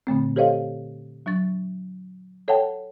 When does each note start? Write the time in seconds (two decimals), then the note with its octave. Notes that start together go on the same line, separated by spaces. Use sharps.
0.07 A#2 D3 A3 C4
0.36 G4 A4 C5 C#5 D#5 F5
1.26 F#3 D4 C#6 A6
2.48 A4 C#5 E5 F#5 G5 A5